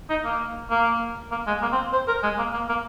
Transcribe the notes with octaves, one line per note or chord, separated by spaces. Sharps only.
D#4
A#3
A#3
A#3
G#3
A#3
C4
C5
A#4
G#3
A#3
A#3
A#3